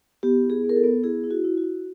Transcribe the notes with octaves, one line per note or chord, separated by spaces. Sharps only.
B3 G4
E4
G#4
B3
A#4
A4
B3
E4 G#4
E4
F#4
E4
F#4
E4